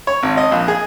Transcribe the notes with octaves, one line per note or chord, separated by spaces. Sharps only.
C#5
G#1
D#5
A#1
G#4